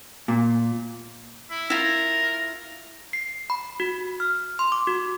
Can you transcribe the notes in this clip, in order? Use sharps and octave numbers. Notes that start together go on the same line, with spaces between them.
A#2
E4
E4 F4 A#4
C7
B5
F#4
F6
C6
D6
F#4